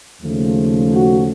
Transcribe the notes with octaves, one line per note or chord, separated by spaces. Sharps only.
D#2 C#3 F3 A3
F#4